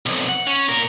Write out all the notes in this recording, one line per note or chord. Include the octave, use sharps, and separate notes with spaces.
B1 F2
F#5
C#4
A#2 A#4